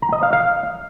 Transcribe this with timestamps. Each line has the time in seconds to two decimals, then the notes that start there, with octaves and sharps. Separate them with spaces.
0.02 A#5
0.12 D#5
0.23 F5
0.33 F5